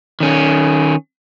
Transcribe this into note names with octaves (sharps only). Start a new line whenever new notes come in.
D#3 C#4